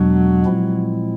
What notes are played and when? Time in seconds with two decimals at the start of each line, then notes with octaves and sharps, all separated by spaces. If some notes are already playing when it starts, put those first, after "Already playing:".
Already playing: E2 B2 F#3 G#3 B3 D4
0.45 A#2 F3 G#3 C4 E4